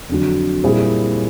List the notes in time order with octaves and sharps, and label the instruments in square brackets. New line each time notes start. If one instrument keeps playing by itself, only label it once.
[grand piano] F2 D3 F#3
A#2 G3 C4 E4 G#4